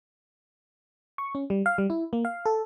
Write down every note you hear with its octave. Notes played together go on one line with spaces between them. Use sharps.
C#6
C#4
G3
F5
G3
E4
A#3
F5
A4